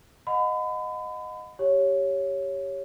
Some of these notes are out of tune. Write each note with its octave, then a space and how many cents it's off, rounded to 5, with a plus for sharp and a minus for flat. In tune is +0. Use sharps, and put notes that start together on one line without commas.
D#5 +0 F#5 -35 B5 +35
G4 +0 C#5 +0